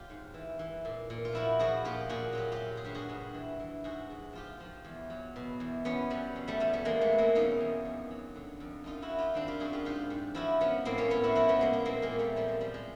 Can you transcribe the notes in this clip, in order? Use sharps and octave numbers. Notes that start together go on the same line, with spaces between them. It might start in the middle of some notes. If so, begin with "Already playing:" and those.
Already playing: F#3 F4 G4
G#2
E3
E3
A#2
A#2
F4
F3 E4 F#4
F3 F#4 G#4
A#2 F4 G4
A#2 F#4 G#4
F#3 F4 G4
F4 G4
F#3
G#4
G2 G4
F#4 G#4
G2
E3
E3
G#2 F#4 G#4
G#2
F3 F4 G4
F3
E2
F#3
B2
E2
E2 B3 C#4
F#3 G3
B2
G3 A3
E2 G3 A3
G3 A3
E2 G#3 A#3
A3 B3
F#3
A#3 C4
B2 C#4 D#4
E2
F2
F#3
D3
F2
F#2 D#4 F4
E4 F#4
F#3
F4 G4
D#3 C4 D4
F4 G4
F#2 F#4 G#4
F4 G4
G#2 F4 G4
G#2
F3 E4 F#4
F3 B3 C#4
A2 A#3 C4
B3 C#4
A2 B3 C#4
E4 F#4
F3 E4 F#4
B3 C#4
F3 G#3 A#3
G#3
A#2 A#3 C4
G#3 A#3
A#2
G3 A3
F3 G3
G#3
F3 G3
G#3